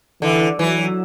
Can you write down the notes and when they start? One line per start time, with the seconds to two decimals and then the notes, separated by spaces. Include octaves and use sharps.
0.22 D3 E3
0.59 E3 F#3